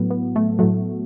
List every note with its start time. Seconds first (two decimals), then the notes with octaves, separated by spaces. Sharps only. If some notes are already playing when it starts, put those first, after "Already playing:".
Already playing: A2 F#3 B3
0.10 B3
0.36 A3
0.59 A2 F#3 A3